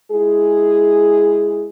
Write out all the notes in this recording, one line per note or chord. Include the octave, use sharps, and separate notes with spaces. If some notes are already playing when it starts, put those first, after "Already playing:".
G#3 E4 G#4